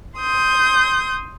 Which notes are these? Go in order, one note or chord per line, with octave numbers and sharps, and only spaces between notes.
C6 D#6 G6